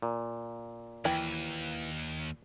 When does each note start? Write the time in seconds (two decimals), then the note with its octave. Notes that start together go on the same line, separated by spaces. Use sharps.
0.02 A#2
1.05 D#2 E3 G5 B5